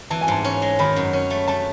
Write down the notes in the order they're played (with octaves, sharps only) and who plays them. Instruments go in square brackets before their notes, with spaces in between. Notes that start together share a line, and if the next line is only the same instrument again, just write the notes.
[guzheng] E3 [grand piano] A5
[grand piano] G#5
[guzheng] G#2 [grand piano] A5
[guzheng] C#4
G#3
[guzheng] D#3 [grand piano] B5
[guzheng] F#2
C#4
A3
[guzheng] A3 [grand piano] A5